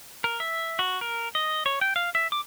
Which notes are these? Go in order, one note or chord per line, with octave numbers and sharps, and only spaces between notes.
A#4
E5
F#4
A#4
D#5
C#5
G5
F5
E5
D6